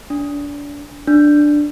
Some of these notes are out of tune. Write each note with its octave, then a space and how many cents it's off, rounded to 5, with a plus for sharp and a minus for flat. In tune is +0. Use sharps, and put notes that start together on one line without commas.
D4 -30
D4 +5